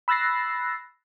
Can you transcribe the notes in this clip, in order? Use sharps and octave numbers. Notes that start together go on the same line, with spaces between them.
B5 E6 F#6 A6 A#6 C7